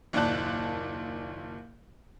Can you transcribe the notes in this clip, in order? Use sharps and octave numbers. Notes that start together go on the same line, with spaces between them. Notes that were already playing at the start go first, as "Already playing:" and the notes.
F#1 D#2 A#2 D5 A5 F#6